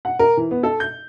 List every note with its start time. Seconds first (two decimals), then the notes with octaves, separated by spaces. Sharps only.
0.05 F#5
0.19 A#4
0.37 E3
0.51 B3
0.63 A4
0.80 G6